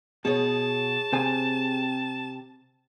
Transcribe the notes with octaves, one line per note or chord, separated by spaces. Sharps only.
B2 G#4 C#5 A5
C3 C5 G#5